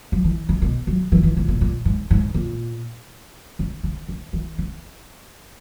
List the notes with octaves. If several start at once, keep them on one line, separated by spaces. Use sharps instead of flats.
F#3
E3
C#3
B2
F#3
E3
E3
A#2
A#2
A#2
G#2
G#2
A#2
C#3
C#3
C#3
E3
C#3